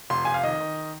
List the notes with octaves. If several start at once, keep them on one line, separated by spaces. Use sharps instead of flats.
F1 C6
F1 G#5
F5
D#3 D#5
D#3